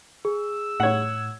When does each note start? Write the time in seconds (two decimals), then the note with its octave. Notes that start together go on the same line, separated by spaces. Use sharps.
0.25 G#4 E6
0.80 A2 C#5 F#5 G#6